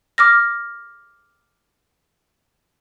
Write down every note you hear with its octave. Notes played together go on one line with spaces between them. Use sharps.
D6 F6 A#6